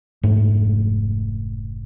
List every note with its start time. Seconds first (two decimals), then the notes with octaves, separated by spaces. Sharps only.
0.23 F1 G#2 A3